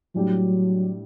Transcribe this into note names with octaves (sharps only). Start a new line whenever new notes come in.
A2 F#3 G3 D4 G4